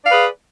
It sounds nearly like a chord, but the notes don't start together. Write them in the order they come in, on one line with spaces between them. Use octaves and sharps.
D5 F5 B4 G#4